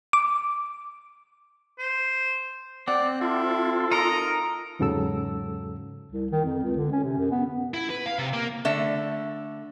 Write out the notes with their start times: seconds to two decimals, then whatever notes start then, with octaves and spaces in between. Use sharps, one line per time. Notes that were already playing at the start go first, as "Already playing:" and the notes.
0.13 D6
1.79 C5
2.88 C4 D5 F#5
3.21 E4 F4 A4
3.91 D#4 A#4 D#5 A#5
4.79 E2 G#2 C#3 F#3 A4 E6
6.12 C2
6.32 D#3
6.44 F2
6.63 C#2
6.77 D3
6.92 C#4
7.03 C3
7.18 F#2
7.31 B3
7.74 E4
7.90 B4
8.06 F5
8.19 C3
8.33 A#3
8.65 D3 A3 E5